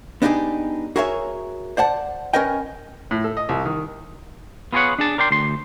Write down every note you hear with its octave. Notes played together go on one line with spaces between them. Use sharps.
B3 D4 D#4 F4 G4 G#4
F#4 G#4 A#4 C#5 E5
C5 D5 F#5 A5
C#4 A#4 B4 D#5 G5
A2
A4
D#5
C2
D#3
B3 F4 G#4 A4 C#5 F#5
D4 G#4 A5
A#4 D5 G5 C6
D2 C6